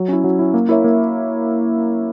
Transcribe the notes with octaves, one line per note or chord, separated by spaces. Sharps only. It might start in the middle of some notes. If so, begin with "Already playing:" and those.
Already playing: F#3
C#4 E4
F#3
C#4 E4
A#3
E4 A#4 C#5 E5
A#3